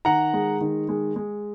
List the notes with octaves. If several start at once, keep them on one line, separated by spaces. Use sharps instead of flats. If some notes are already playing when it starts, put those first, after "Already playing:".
D#3 F#5 A#5
G#3
D#3
G#3
G#3